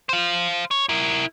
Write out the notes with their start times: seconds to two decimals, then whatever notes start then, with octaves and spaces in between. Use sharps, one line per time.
0.09 C5 F5
0.71 C#5
0.89 E4 A#4